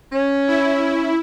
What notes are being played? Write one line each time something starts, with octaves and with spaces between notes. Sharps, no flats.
C#4
E4